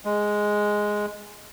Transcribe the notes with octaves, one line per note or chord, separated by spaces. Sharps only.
G#3